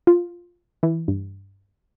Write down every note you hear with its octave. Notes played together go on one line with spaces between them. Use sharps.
F4
E3
G2